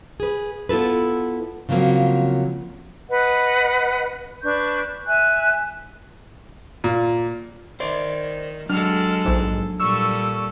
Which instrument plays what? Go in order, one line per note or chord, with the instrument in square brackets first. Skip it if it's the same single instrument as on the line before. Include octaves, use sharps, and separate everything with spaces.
[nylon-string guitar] G#4 B4
B3 E4 F4 A4 B4
C#3 F3 F#3 A#3 C4
[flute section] B4 D#5 F#5
D4 B4 C#6 G6
E5 G#5 F#6
[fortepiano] A#2
[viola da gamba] D#3 [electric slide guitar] C5 D5
[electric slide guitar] F#3 D4 [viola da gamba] G#3 A4 [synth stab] F6
[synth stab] A#1 G#2
[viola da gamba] A#2 G3 A4 [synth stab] C#6 E6